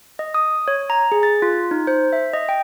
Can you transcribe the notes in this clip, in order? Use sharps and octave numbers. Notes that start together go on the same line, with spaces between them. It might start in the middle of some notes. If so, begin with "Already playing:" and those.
D#5
D#6
C#5
A#5
G#4
A6
F4
D#4
C5
E5
D#5
G5